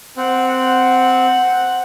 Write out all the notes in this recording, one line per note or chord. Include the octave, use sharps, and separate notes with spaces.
C4 F#5
F#5
C4
C4